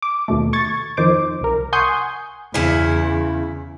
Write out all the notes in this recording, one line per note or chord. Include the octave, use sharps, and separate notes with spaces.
D6
D#2 B2 A3
C#6 G#6 A6
F2 D#3 C5 D6
C2 A#4
F#5 G#5 C6 C#6 D#6 G6
E2 C#3 E4